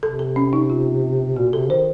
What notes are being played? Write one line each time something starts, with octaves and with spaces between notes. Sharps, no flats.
C3 A4
A4
C#4
D#4
F4
C3
A#2 F#4
C3 A4
D#3 C5